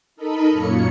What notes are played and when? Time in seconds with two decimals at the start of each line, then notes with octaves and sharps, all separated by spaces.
0.16 D#4 A4 A#4 D#5 B5
0.51 F#2 A#2 A#3 C#5 C#7